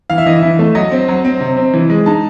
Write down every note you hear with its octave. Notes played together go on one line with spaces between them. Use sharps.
E3 F5
E5
E3 D#5
E5
E3
A3
F#3 D#5
C4
F#3
C4
C3
C4
E3
G#3
D#4 A5